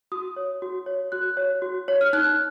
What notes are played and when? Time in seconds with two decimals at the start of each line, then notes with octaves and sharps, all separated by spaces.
0.12 F#4 D#6
0.36 C#5
0.62 F#4
0.86 C#5
1.12 F#4 F#6
1.37 C#5
1.62 F#4
1.88 C#5
2.01 F6
2.13 D#4 F#6